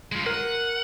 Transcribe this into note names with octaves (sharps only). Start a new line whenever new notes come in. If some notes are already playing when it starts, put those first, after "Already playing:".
G#3 F4
A#4 F#5